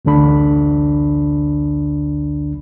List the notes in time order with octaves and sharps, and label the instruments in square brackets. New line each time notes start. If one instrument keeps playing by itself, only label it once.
[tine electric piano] A1 D2 D3 D4 B5